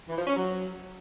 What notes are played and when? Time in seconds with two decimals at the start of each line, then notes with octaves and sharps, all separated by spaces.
0.09 E3
0.18 F3
0.27 C#4
0.36 F#3